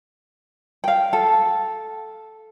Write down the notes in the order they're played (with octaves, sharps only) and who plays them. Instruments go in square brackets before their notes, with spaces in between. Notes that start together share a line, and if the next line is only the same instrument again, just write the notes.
[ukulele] F5 G5
A4